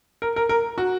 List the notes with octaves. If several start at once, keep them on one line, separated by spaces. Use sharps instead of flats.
A#4
A#4
A#4
F#4